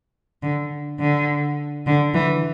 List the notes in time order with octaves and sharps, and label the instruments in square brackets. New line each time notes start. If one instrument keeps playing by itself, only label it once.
[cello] D3
D3
D3
E3